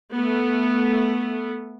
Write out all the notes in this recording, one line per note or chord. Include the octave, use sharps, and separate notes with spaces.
A3 B3